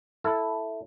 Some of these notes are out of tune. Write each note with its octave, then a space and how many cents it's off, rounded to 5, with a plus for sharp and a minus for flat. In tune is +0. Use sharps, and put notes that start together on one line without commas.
E4 +0 A4 +0